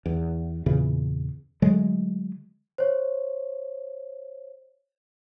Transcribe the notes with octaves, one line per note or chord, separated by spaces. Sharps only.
E2
E2 A#2 C#3 E3
D3 F#3 G#3 A3
C5 C#5